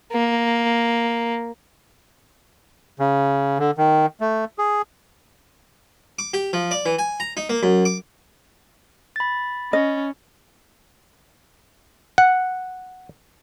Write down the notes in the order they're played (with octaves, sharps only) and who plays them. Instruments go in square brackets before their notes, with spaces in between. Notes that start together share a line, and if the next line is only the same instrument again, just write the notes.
[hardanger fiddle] A#3
[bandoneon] C#3
D3
D#3
A3
G#4
[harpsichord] D6
G4
F3
D5
E3
G#5
A#5
D#4
A#3
F#2
D6
[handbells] B5 A6
[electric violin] C#4 [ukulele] D#5
[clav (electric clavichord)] F#5